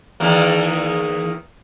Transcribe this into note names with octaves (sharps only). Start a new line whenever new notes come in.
E2 D#3 A#3